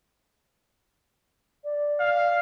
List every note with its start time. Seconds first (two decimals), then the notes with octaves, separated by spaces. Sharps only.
1.64 D5
2.00 F5